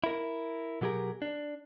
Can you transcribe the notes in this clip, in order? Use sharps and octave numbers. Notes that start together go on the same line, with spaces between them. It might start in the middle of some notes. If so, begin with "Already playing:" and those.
E4 A#4
B2 F#3 G4 G#4 A#4
D4